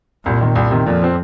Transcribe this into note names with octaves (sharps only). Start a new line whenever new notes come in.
C2 A#2
C3 D#3
C2
C3 D#3
F2 A#2
F3 C4